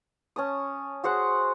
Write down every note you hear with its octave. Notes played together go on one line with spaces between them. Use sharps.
C#4 A5 D#6
F#4 G#4 C5 F#5